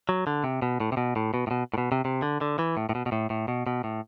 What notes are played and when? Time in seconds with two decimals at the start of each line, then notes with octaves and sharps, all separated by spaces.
0.09 F#3
0.27 D3
0.44 C3
0.62 B2
0.80 A2
0.92 C3
0.97 B2
1.16 A2
1.34 B2
1.47 A2
1.51 B2
1.74 A2
1.78 B2
1.92 C3
2.05 C3
2.22 D3
2.41 D3
2.59 E3
2.77 A2
2.89 A2
2.95 B2
3.06 B2
3.12 A2
3.30 A2
3.48 B2
3.67 B2
3.84 A2